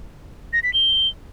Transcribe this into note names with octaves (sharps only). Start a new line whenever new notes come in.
A#6
B6
G7